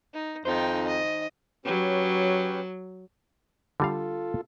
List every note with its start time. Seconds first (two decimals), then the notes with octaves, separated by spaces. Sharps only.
0.14 D#4
0.45 F2 D#3 D#4 C5 G5
0.85 D#5
1.65 F#3 C#4 G4 B4
3.80 D3 G3 F4 A4 F5